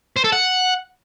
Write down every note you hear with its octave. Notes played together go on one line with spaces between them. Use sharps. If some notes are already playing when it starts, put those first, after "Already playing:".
C5
A4
F#5